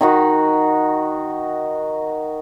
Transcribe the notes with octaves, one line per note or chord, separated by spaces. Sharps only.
D#3 D#4 F#4